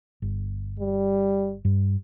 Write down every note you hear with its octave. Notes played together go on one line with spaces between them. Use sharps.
G1
G3
G2 G3